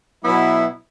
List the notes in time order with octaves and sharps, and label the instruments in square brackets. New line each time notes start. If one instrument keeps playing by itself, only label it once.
[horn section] B2 F#3 B3 E4